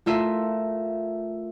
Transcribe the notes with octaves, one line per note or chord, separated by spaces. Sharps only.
A3 F4 A#4 E5 C7 D#7